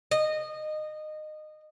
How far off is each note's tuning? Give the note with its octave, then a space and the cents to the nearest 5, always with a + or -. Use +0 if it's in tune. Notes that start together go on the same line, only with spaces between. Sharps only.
D#5 -20